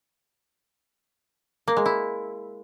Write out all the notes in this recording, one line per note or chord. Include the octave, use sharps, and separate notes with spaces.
A#3
G#3
E4